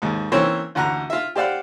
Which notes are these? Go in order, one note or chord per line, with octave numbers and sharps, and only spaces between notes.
D#2 G#2
E3 A#3 C4 C#4 C5 C#5
A1 D2 F#5 A#5 F#6
F4 E5
G4 C5 D5 F5 F#5